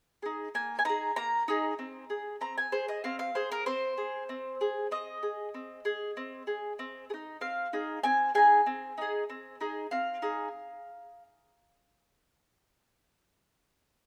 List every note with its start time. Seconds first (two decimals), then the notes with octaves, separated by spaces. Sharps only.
0.22 D#4 G#4
0.55 A#3 G#5
0.79 G#5
0.85 D#4 G#4 A#5
1.16 A#3 A#5
1.48 D#4 G#4
1.79 C4
2.10 G#4
2.41 C4 A#5
2.58 G#5
2.72 G#4 C5
2.88 D#5
3.04 C4 F5
3.19 F5
3.35 G#4 C5
3.52 A#4
3.66 C4 C5
3.97 G#4
4.29 C4
4.61 G#4
4.91 C4 D#5
5.23 G#4
5.54 C4
5.85 G#4
6.17 C4
6.47 G#4
6.79 C4
7.10 G#4
7.14 D#4
7.41 C4 F5
7.73 D#4 G#4
8.03 C4 G#5
8.35 D#4 G#4 G#5
8.66 C4
8.98 D#4 G#4
9.30 C4
9.61 D#4 G#4
9.91 C4 F5
10.22 D#4 G#4